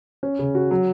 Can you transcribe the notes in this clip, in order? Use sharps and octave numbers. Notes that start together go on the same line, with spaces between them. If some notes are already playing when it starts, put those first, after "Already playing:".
C#4
C#3
F#4
F#3